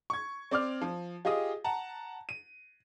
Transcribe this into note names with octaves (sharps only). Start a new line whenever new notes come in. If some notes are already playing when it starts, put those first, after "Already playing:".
C#6 G#6
C4 D5 D6 F6
F3
F4 G4 G#4 D#5 D#6
F#5 A5 A#5
D#7